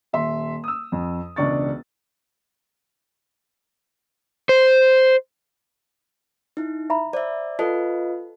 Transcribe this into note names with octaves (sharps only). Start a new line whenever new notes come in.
D#1 E5 C6
D#6 E6
F2
E1 C#2 D4 C#6 A6
C5
D#4 E4
E5 A#5 B5
C5 D5 E5
F4 A4 B4 D#5 A5